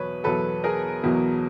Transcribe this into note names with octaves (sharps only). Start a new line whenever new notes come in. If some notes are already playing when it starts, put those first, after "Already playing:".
Already playing: E2 B2 F#3 B4 C#5
E2 B2 F#3 A4 B4
G#4 A#4
E2 B2 F#3